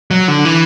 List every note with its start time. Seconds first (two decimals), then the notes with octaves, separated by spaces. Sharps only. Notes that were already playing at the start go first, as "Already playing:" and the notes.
0.11 F#3
0.28 D3
0.45 E3